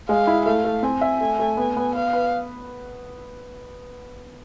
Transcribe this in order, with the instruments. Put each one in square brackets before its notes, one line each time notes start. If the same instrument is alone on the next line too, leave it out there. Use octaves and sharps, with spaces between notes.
[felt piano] G#3 [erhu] F5
[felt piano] E4
[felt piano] A3 [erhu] F5
[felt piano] A3
[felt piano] C4 [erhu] G#5
[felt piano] E5
A3
A3
B3
B3
[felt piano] B4 [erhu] F5
[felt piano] B4